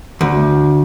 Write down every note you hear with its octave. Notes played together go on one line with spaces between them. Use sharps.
D2